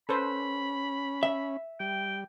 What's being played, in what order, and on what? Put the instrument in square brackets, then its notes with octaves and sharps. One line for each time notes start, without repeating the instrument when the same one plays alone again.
[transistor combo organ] C#4 [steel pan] A4 B4 C5 [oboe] B5
[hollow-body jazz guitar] E5
[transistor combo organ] G3 [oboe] G5